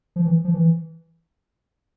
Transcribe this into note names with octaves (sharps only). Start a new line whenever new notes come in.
F3
E3
F3
E3